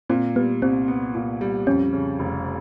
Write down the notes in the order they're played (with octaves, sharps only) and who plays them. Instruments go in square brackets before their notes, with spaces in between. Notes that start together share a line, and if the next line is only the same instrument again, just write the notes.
[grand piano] A#2 [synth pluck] C4
[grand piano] G3 [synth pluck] B3
[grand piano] C2 [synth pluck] C4
[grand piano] B3
A#2
G3
[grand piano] F2 [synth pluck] C#4
[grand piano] C#3
F1